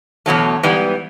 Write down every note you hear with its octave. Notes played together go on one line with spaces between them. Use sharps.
E2 B2 F#3 A3
G#2 E3 G3 B3